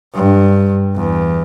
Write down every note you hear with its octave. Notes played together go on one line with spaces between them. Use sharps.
G2
E2